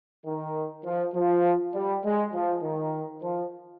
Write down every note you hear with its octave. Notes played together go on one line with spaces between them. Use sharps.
D#3
F3
F3
G3
G#3
F3
D#3
F3